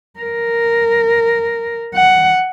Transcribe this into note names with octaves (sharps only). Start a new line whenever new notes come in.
A#4
F#5